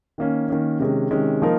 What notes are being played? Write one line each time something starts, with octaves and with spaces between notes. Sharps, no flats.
D#3 A#3 C#4
D#3 A#3 C#4
C3 D#3 G#3 C#4
C3 D#3 G#3 C#4
F3 A#3 D#4 A#4